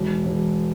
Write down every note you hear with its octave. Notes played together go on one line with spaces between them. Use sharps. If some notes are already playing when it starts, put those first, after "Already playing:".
Already playing: E1
E1